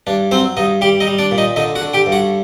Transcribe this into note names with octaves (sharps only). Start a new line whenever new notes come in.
G2 D4
F#3 C4 C5
G2 D#4 D#5
G3 G4 G5
D#4 D#5
G3
D4 D5
A#2
D#4 D#5
D3 D#4 D#5
F#4 F#5
D3
G4 G5
G2
F#4 F#5